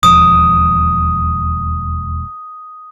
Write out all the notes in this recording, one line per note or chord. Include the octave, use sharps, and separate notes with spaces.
E1 D#2 F3 D#6